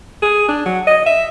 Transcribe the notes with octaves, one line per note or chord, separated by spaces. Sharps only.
G#4
D4
F#3
D#5
E5